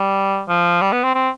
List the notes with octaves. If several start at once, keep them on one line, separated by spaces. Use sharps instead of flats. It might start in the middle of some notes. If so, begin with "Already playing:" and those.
Already playing: G3
F3
G3
B3
C4
C4